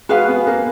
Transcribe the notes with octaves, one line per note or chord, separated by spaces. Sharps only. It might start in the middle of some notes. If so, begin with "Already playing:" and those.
G#3 F#4 B4 F5 G#5
B3
A#3